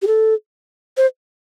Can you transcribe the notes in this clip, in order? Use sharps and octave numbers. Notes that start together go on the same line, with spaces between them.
G4
A4
C5